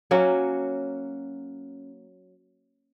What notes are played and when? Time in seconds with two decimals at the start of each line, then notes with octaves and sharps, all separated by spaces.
0.11 F#3 A#3 C#4 F#4